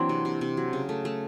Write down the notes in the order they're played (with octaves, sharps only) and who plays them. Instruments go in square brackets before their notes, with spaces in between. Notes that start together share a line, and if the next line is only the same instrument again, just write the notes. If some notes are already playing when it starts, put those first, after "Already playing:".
Already playing: [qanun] E3 F#3 A#3 C4 D4
C3
C3
C3
F#3
C#3
A3
A3